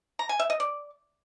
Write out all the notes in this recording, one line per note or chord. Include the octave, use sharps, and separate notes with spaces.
A#5
G#5
E5
D#5
D5